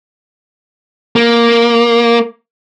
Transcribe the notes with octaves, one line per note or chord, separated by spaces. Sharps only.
A#3